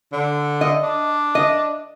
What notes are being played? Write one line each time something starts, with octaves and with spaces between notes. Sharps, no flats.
D3
D#5
D4
D#5